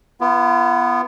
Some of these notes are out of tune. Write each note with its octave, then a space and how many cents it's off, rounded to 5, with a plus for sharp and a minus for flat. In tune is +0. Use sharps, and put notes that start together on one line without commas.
B3 -5 F4 -40